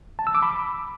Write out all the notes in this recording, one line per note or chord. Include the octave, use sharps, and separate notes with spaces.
A5
E6
D6
B5